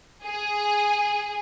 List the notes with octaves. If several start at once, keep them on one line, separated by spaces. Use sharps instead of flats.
G#4